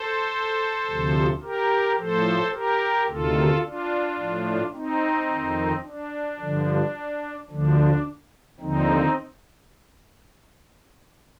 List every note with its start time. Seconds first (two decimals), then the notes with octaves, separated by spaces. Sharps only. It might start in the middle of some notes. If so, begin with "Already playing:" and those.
Already playing: A4 C5
0.88 D2 C3 F3
1.43 G4 A#4
1.98 A2 F3 A4 C5
2.53 G4 A#4
3.08 D2 C3 D#3 F4 A4
3.64 D4 F4
4.19 A2 F3
4.74 C4 D#4
5.30 F2 D#3
5.85 D4
6.39 G2 D3 F3
7.50 D2 D3 F3 D4
8.60 D#2 D3 F3 C4 D#4